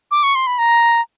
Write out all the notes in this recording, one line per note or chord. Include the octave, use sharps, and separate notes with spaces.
D6
C#6
C6
B5
A#5